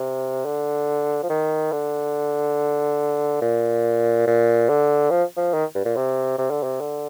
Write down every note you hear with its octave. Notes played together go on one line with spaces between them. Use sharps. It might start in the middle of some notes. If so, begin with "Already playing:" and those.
Already playing: C3
D3
F3
D#3
D3
A#2
A#2
D3
F3
F3
D#3
G2
A#2
C3
C3
D3
C3
D3